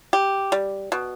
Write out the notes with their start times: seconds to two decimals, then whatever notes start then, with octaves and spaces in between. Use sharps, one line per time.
0.13 G4
0.52 G3
0.92 B2